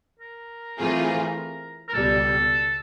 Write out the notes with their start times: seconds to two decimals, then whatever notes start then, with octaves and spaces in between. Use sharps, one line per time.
0.20 A#4
0.78 E3 A3 C4 F4 G#4
1.89 A#4
1.94 C#2 B2 G3 A4